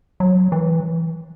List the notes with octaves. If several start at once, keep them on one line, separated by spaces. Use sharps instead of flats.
F#3
E3